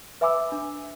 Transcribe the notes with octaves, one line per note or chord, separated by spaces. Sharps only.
B4 E5 G#5 B5 D6 E6
D4